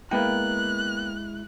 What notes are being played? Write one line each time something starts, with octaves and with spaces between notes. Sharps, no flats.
G#3 A#3 B3 E4 G5 F#6